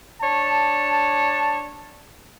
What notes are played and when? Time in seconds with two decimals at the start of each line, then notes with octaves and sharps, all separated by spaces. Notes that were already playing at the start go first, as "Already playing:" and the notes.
0.22 D4 C#5 A5